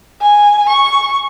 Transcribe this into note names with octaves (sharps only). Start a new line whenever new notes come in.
G#5
C#6